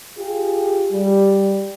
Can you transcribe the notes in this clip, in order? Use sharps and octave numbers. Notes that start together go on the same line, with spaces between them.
F4 G4 G#4
G3